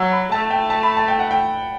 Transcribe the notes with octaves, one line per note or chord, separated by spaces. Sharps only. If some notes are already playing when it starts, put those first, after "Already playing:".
Already playing: F#3 E6
B5
A3 A5
G5
A5
B5
A5
G5
F#5
G5